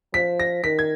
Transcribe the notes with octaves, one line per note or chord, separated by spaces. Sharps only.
F3 B6
A#6
D#3 B6
G#6